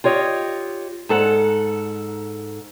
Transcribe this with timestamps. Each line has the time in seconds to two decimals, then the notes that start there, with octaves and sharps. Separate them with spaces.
0.04 F4 G4 C#5 D#5
1.09 G#2 A4 F#5